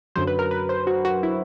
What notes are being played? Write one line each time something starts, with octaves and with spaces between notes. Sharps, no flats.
F#2 D3 F#3 C5
B4
A#4
B4
C5
F#4
F#4
E4